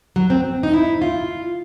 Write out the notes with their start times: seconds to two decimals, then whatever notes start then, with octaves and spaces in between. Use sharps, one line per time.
0.16 F#3
0.30 C4
0.63 D#4
0.73 E4
1.02 F4